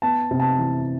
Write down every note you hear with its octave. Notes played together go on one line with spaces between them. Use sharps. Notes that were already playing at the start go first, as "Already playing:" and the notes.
B3 A5
C3
A5
E3